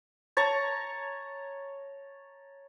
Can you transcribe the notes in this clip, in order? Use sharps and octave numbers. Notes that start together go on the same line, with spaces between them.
C#5 A5 A#5 C#6